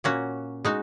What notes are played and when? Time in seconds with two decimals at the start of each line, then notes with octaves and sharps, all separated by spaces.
0.04 A#2 A#3 C#4 F#4
0.65 G#3 D#4 F#4